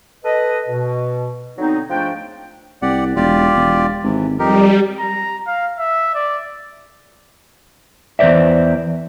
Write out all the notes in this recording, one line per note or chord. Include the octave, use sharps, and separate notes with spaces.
A4 B4 D#5
B2
D3 F#3 B3 C4 D#4
G#2 F3 A3 D4 G5
C2 G4 D5 F#5
E1 F4 G4 D5
E1
G#1 C3 E3
F2 G3 D#4 G4 A#4
A#5
F5
E5
D5
E2 C3 C5 D5 E5